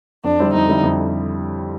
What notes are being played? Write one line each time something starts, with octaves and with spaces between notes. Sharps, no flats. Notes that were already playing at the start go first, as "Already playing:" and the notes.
F2 D4
D3 G3 C4 E4
F2 D#4
D3 G3 C4 E4
F2